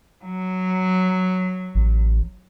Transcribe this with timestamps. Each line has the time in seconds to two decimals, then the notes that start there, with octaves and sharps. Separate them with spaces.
0.25 F#3
1.75 A1